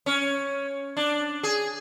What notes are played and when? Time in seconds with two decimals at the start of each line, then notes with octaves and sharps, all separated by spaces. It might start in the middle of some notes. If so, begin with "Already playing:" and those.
0.06 C#4
0.97 D4
1.43 G#4